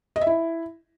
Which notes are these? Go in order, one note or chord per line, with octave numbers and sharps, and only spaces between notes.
D#5
E5
E4